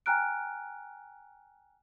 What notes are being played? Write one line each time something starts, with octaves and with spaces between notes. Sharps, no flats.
G5 G#5 A#5 F6 F#6 D7